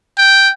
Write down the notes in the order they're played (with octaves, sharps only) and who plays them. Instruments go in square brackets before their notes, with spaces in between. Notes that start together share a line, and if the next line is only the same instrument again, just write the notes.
[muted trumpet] G5